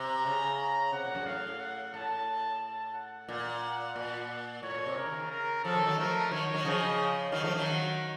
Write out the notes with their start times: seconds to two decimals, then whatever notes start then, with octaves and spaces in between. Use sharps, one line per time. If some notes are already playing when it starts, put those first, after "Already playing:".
Already playing: C3 A#5
0.26 C#3
0.59 A#5
0.92 C3 F#5
1.05 A#2
1.15 F#2
1.26 A2 F5
1.60 F#5
1.94 A2 A5
2.61 A5
2.94 F#5
3.28 A#2
3.63 F#5
3.96 A#2
4.63 A2 C#5
4.74 A#2
4.86 C3
4.96 C#3 A#4
5.06 D#3
5.13 C#3
5.31 A#4
5.64 C#3 F3 A4
5.75 D#3 F#3
5.86 D#3 F#3
5.98 F3 A3 A#4
6.31 D#3 F#3 C#5
6.54 D#3 F#3
6.65 C#3 F3 D#5
7.32 D#3 F#3 F5
7.44 F3 A3
7.55 D#3 F#3
7.67 F#5